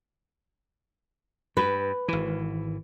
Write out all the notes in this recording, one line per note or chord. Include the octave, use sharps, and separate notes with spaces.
G2 B4
G#1 E3